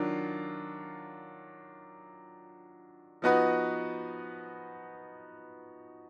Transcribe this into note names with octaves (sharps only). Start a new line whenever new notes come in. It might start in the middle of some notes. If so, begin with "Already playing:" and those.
Already playing: D#3 F#3 D4 F4
F3 B3 D#4 F#4 B4